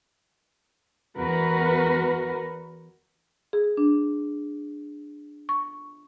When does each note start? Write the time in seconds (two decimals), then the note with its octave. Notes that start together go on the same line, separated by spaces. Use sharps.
1.17 E2 F#4 A#4 B4
3.53 G#4
3.77 D4
5.49 C#6